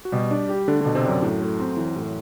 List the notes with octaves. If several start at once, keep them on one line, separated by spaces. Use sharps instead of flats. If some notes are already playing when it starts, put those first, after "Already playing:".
F#4
B2 G3 G4
D4
G4
D3 A3 D4
B2 D3 D4
C3 C4
F#2 F#3 D4
A2
A3
C4
E3
A2